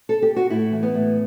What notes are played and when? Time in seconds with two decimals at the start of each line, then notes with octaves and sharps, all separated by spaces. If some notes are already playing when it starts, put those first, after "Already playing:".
0.09 A4
0.22 G4
0.36 F#4
0.50 A2 E4
0.72 E3
0.83 B3
0.94 A2